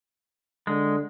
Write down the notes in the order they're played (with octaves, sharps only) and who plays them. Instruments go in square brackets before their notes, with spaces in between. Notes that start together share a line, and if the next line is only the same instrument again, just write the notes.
[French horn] D3 [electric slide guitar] G#3